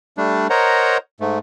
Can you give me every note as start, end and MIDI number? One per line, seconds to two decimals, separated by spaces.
0.18 0.47 55
0.18 0.47 57
0.18 0.47 62
0.50 0.97 70
0.50 0.97 72
0.50 0.97 73
0.50 0.97 75
0.50 0.97 78
0.50 0.97 82
1.20 1.39 44
1.20 1.39 57